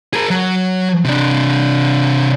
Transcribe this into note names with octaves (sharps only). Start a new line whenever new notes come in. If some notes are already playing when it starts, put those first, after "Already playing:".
G#4 A#4
F#3
C3 D4